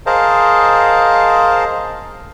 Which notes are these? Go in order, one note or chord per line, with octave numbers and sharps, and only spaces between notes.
G#4 A#4 C5 D#5 F5 A5